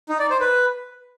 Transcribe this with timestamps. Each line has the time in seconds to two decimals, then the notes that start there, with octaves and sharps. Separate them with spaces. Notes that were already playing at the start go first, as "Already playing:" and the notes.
0.09 D#4
0.20 D5
0.30 C5
0.41 B4